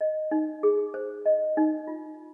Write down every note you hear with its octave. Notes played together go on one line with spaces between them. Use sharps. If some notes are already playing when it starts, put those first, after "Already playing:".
D#5
D#4
G#4
C5
D#5
D#4
F4